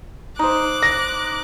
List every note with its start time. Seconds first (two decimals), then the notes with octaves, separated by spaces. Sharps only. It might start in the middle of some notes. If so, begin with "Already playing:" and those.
0.39 D#4 C5 D6 F#6
0.83 A#6